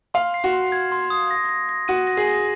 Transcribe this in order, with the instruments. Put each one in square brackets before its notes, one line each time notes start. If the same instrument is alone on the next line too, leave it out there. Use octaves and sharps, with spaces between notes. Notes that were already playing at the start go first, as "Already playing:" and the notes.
[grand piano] F5 [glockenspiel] C6
[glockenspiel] C7
[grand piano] F#4
[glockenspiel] C6
G#6
C6
D#6
A#6
A#6
A#6
[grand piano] F#4 [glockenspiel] D#7
[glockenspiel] A#6
[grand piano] G#4
[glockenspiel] A#6